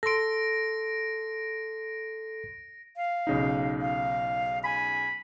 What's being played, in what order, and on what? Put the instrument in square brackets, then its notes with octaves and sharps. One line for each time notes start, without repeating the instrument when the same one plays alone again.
[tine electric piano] A4 C6 [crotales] A#6 D7
[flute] F5
[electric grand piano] B1 C#3 D#4
[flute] F5
[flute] G#5 [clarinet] B5